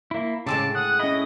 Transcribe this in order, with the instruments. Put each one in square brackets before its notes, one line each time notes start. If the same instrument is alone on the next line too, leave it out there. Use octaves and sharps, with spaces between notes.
[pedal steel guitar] A#3 E4
[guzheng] A2 G#3 C4 [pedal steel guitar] C#3 E6 [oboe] A5 [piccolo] D6
[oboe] F#5 [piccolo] D#6 [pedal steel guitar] F#6
[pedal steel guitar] C#4 E4 [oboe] D#5